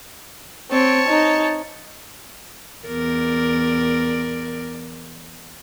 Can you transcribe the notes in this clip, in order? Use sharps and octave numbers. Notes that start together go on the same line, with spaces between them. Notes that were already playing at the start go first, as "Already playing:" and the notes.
C4 C#5 A5
D#4
E2 A#4 D5